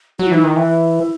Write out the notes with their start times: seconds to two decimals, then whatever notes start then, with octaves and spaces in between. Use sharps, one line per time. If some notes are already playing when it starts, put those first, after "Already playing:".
0.19 F#3 F#4
0.27 E4
0.32 E3 D#4
0.42 D#3 E4
0.56 E3